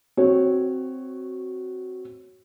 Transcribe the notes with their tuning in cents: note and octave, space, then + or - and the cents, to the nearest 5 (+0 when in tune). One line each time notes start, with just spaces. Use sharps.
C4 +0 F#4 +10 C#5 -10